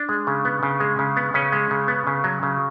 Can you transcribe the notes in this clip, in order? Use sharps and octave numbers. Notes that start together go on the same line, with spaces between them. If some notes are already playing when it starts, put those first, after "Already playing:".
Already playing: D4
G#3
C#3
B3
C#3
G#3
C#3
B3
C#3 C#4
G#3
C#3
B3
C#3
F#3
C#3